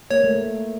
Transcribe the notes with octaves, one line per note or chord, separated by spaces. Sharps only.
A#3 C#5
A3